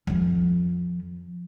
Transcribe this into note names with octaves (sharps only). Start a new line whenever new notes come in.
F2 F3